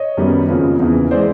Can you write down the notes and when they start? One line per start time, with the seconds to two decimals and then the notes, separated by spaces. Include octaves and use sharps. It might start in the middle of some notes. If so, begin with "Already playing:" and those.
Already playing: C#5 D#5
0.17 F#2 D#3 G3 B3
0.49 F2 C#3 F3 A#3
0.80 E2 C#3 E3
1.11 E3 G#3 C4 C5 D5